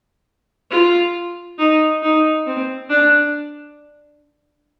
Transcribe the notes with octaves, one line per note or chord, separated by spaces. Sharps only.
F4
D#4
D#4
C4
D4